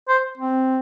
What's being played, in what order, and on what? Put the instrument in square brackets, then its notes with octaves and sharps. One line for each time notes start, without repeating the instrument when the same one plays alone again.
[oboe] C5
[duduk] C4